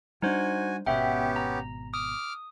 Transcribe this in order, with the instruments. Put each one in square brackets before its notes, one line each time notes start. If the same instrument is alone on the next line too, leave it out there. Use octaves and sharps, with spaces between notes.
[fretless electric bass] G3 D4 [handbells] D#4 C5 [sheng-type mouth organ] F#4 G#5
[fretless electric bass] G#1 B2 [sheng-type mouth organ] B3 C#4 G4 [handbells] E5 F#5 G5
[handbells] A#5
[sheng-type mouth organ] D6 F6 [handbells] D#6